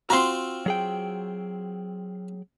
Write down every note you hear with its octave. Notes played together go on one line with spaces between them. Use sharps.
C4 F4 F#4 A#5 C6
F#3 G#4 G5